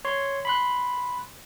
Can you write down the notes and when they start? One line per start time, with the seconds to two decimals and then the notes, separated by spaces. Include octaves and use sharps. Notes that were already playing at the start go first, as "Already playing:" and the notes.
0.05 C#5 C6
0.45 B5 C6 F#6